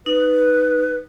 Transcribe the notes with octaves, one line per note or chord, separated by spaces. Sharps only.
D#4 B4